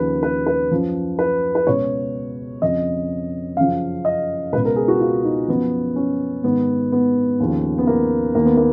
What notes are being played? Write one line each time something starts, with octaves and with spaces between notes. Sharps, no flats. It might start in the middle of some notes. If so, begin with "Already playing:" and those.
Already playing: D#2 C#3 F3 B4
B4
B4
F#2 F3
B4
B4
C#2 B2 C#5
F2 C#3 F3 D#5
F#2 C#3 F3 F5
D#5
C#2 B2 B4
A#4
G#4
F#4
F4
D#4
F#2 F3 B3
C#4
G#2 D#3 B3
B3
D#2 C#3 F3
B3
A#3
D#2 D#3 A#3
B3
A#3